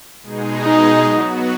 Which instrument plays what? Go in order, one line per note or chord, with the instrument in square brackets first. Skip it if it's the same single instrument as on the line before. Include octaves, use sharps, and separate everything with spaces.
[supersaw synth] B2 G#3 D#4 G#4
[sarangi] D#4
[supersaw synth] F#3 B3 F#4